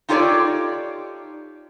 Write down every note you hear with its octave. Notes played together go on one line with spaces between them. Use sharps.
D#4 F4 G4 A4 C#5 D5